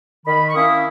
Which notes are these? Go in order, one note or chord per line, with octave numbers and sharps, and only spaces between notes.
D#3 B5
C#6
A#3 C#4 E4 D#6